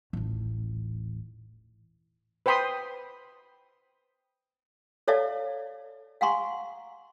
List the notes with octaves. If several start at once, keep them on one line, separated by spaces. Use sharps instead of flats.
D#1 A1
B4 C5 G5 B5 C6 D#6
A4 C#5 D5 E5 F5 A5
F5 F#5 G#5 A#5 C6 C#6